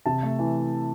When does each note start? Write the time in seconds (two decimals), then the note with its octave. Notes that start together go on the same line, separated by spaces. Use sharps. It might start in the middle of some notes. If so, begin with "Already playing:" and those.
0.06 C3 A5
0.23 A3
0.39 E3